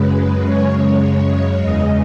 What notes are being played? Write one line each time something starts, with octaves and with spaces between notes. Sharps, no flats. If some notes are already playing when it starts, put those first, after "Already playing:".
Already playing: F#2 C#3 G#3 B4
C#5
E2 C#3 G#3 D#5